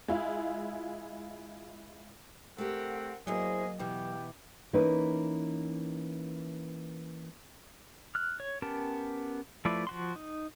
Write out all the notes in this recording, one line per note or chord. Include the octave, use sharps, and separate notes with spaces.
G#3 E4 F4
A3 C4 G4 A#4 F#5
E2 E3 F#3 A#3 G#4 C5 D#5
B2 E3 B3 G4
E3 A#3 C#4 D#4 B4
F6 F#6
C#5
B3 C#4 G4 A#4 A5
F3 A3 E4 B4 D5
F3 F#4 C6
D#4